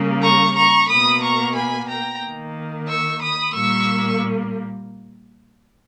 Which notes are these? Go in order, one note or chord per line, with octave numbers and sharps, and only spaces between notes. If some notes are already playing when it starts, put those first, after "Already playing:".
Already playing: C#3 G3 A#3
A#5 C#6
A#5 C#6
B2 A#3 B5 D#6
A#5 C#6
G#5 B5
G5 A#5
D#3 A#3
C#6 E6
B5 D#6
A#2 G3 A#3 C#6 E6